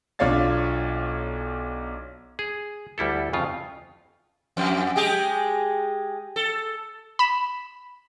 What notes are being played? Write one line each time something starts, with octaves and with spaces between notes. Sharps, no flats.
B1 D4 F4 C#5 F5 A6
G#4
D2 G3 E4 A4
F2 C#3 F4
F2
G#3 G4 G#4
A4
B5 E7